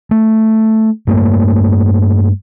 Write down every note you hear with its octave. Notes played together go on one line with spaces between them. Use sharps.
A3
G2 A3 A#3